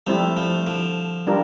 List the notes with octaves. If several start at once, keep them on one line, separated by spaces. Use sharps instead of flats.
F3 G3 A3 C4 E4
F3 A3
D3 F3
G3 D4 F4 A#4